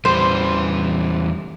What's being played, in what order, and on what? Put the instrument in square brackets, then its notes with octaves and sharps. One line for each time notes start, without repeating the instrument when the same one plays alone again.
[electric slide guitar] E2 G3 [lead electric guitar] E3 B4 [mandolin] C5